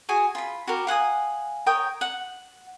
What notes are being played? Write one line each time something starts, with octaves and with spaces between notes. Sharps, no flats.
F#4 G#4 G#5
F4 A#5 B5
F#4 G4 A#4
F5 F#5 G#5 D#6
A#4 C#5 G5 D#6
F#5